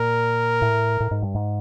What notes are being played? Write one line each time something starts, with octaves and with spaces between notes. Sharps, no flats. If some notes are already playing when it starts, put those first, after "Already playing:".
Already playing: A#2 A#4
A2
A2
G#2
G2
G#2